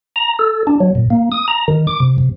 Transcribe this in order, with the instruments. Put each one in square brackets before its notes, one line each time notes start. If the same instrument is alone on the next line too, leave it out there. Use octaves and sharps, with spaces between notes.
[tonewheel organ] A#5
A4
D4
F#3
A#2
A#3
D#6
A#5
D#3
D6
C3
C3